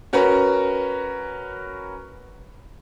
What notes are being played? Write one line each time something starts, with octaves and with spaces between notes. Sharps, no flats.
C#4 F#4 A#4 B4